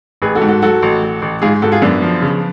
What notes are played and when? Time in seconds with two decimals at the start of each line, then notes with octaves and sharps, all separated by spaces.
0.22 A1 G#4 B4
0.35 F#4 A4
0.42 G#2
0.48 F#4 A4
0.62 F#3 F#4 A4
0.82 A1
1.03 A1
1.22 A1
1.42 G#2 F4 G#4
1.62 G#2 F#4 A4
1.72 F4 G#4
1.82 F#2 B3 D4
2.02 F3
2.22 C#3